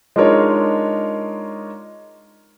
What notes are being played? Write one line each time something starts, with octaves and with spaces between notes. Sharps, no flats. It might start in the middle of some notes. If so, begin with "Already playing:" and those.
G#3 D4 D#4 F4 A#4 C#5